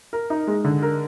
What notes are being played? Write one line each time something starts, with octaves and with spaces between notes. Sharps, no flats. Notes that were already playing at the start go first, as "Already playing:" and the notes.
A#4
D#4
G#3
D3
A#4